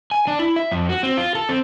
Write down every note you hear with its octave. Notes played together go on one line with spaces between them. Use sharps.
G#5
D4
E4
E5
F2
F#4
C4
F4
A4
C4